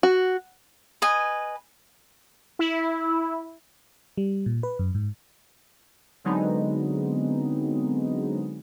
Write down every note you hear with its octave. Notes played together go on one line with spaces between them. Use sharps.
F#4
B4 D#5 G#5
E4
G3
A#2
B4
F#2
G#2
D3 F#3 G#3 B3 C4 D#4